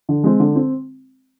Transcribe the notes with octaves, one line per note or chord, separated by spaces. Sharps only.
D3
G#3 C4
D3
C4